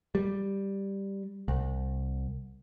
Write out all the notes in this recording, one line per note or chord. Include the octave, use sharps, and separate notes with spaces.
G3
C2